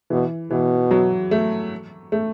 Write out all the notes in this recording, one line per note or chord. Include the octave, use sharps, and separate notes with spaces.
B2 E3
B2 E3
F#3
A3
A3